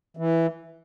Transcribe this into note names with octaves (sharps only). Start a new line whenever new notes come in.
E3